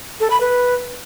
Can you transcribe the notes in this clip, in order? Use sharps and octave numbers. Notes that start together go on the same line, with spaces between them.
A4
B5
B4